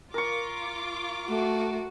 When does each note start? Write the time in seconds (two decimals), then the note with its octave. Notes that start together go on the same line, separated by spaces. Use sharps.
0.14 F4 A#4 C#6 D6
1.28 A3 F#4